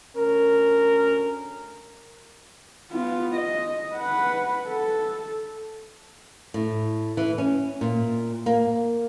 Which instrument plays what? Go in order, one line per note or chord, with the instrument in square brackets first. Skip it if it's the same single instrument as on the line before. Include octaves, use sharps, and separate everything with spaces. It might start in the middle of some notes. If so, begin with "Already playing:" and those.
[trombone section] D2 C#4 A#4
[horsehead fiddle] B3 F4
D#5
B4 F#5
A4
[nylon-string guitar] A2
E3
C#4
A#2
A#3